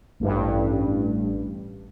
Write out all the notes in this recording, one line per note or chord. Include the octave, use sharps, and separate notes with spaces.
A1 G2